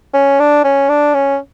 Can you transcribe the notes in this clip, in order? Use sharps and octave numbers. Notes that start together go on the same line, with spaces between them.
C#4
D4
C#4
D4
C#4